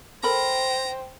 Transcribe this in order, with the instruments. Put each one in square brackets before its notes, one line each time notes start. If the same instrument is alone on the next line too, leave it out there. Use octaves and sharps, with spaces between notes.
[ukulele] A4 A#4 B5 [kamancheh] C5 G5 [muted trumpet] A#5